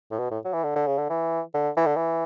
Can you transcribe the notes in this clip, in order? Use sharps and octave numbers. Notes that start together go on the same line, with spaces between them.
A2
B2
A2
F#3
E3
D3
D3
C#3
D3
E3
D3
E3
D3
E3